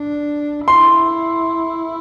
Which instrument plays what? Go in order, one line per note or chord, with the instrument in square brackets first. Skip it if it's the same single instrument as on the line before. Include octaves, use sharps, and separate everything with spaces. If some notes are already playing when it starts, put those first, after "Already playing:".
Already playing: [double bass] D4
[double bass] E4 [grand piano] C6